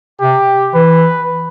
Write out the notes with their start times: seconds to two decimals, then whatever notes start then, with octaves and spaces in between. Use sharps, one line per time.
0.20 C3 G4
0.74 E3 B4